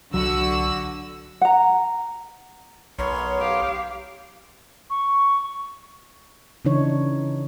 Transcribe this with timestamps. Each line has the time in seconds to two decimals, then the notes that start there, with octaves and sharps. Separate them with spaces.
0.14 C2 D3 F#3 F#4 E6
1.41 F#5 A#5
2.99 B1 B3 A#4 C#5 C6
3.39 G4 F5
4.90 C#6
6.65 C#3 E3 D4 D#4 C#5